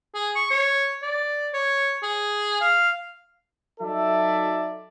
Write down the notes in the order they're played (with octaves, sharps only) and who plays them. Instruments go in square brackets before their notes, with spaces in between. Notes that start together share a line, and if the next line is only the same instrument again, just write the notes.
[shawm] G#4
C#6
C#5
D5
C#5
G#4
F5
[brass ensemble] F#3 D#4 A4 D5 E5